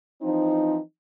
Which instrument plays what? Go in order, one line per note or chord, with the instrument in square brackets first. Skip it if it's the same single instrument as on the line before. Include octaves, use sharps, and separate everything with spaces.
[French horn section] E3 F3 C4 D#4